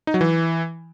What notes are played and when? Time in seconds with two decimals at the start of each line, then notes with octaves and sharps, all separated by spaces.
0.07 D#4
0.14 F#3
0.21 E3